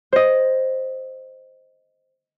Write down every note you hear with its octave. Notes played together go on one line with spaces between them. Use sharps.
C5 D#5